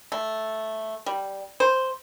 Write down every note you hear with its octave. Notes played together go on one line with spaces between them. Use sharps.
A3
G3
C5